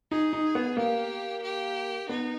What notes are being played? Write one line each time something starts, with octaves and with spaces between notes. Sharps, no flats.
D#4 G#4
D#4
B3
A#3 G4
G4
B3 D#4